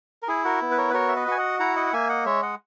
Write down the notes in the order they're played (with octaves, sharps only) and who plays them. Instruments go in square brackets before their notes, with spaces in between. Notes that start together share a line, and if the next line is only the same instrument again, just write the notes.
[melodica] A#4
E4 G#4
F#4 A#4
B3
B4
A#4 C#5
B4
F#4 A#4 C#5
E5
B4 D#5
F#4 G#5
D#5 F#5
E4 F#5 A#5
D#5 F#5
F#5
A#3 E5 G#5
D#5 F#5
G#3 C#5 E5
D#5 F#5